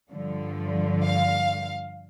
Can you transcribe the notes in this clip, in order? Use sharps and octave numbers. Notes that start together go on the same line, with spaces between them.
G2 D3 F3
F5